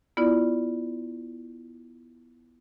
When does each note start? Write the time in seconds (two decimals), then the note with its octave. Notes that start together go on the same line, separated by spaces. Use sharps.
0.17 B3 E4 F4 D5